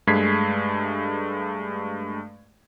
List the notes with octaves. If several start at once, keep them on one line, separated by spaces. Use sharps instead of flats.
G2 G#3 A3 G#6 B6 C7